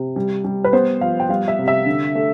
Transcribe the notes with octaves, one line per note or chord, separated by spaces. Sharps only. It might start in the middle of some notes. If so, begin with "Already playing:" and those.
Already playing: C3
G3
G3
B4
B3 C5
F3 F5
G5
G3 F5
E5
C3
E5
D3
A3